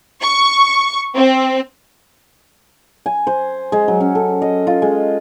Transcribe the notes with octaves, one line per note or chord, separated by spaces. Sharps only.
C#6
C4
G#5
C5
G#3
F#3
C#4
A4
D#5
F4
G#3